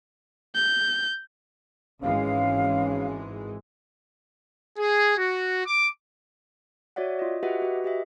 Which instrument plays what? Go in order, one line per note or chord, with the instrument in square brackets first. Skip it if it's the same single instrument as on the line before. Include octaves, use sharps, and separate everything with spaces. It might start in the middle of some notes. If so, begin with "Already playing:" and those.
[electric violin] G6
[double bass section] G#1 E3 G#3 [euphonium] C#4 [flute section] F5
[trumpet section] G#4
F#4
D6
[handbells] F#4 C#5 D5 E5 F#5
F4 D#5
F#4 G4 B4 D#5 E5 F#5
F#4 B4
G4 D#5 E5